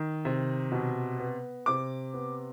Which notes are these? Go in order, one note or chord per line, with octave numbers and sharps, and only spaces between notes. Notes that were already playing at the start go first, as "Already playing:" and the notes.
Already playing: D#3
C3
B2
B3
C3 D6
B3